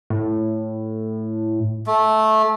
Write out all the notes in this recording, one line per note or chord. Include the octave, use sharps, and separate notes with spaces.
A2
A3